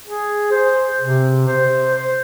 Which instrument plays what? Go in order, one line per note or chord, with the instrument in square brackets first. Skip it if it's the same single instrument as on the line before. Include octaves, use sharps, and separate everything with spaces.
[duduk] G#4
C5
C3
C5
C5